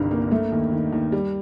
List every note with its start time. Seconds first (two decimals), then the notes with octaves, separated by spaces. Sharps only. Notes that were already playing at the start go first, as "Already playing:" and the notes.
Already playing: G1 C2 G2 D#3
0.11 A#3
0.32 A3
0.52 D#2
0.72 D#3
0.93 D#2
1.12 G3